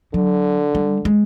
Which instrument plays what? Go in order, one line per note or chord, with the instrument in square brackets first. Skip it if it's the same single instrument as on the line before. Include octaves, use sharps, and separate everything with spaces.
[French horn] D3 [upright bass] F#3
[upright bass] G3
G#3